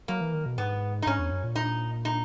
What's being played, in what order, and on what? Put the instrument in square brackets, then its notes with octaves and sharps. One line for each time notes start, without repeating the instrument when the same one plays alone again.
[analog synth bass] F#3 [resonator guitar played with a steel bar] A#3
[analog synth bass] E3
D#3
B2
[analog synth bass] G#2 [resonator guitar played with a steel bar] B3
[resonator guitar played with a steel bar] D#4
[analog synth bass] G#2 [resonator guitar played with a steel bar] C#4
[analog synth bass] E2
F#2
A#2
[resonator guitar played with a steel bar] D#4
D#4